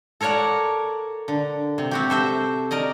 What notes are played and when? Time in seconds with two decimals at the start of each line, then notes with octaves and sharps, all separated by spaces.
0.21 A4 A#4 C#5 D5 F#5
1.28 D3
1.78 C3
1.91 C4 F#4 G4
2.10 A4 C5 E5
2.71 A#4 D5 D#5